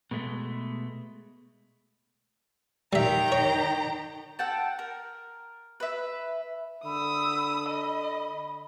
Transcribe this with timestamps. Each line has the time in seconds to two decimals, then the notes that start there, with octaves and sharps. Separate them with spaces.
0.11 B2 G#3 A3
2.93 D#3 G3 E5 G5 A#5
3.32 C#5
4.39 A4 F#5 G5 A5
4.79 A#4
5.80 B4 E5
6.85 D3 B5 D#6 E6
7.69 D#5